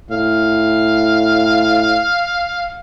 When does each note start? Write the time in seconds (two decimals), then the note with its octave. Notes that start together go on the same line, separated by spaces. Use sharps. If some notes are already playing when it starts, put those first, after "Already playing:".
0.11 A2 F5